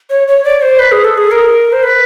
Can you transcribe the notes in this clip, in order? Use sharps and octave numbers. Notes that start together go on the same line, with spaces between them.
C#5
C#5
D5
C5
B4
G#4
A4
G#4
A#4
C5
B4